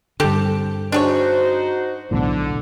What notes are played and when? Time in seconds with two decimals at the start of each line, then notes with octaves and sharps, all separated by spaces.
0.20 G2 D3 C4 G4 A4
0.92 D4 D#4 F#4 G#4 C5 C#5
2.11 B1 E2 A2 D3